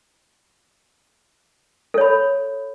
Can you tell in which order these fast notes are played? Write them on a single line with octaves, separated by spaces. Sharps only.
A4 C#5 B5